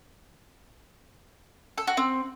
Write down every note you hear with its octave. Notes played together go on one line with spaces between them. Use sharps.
A4
F#4
C4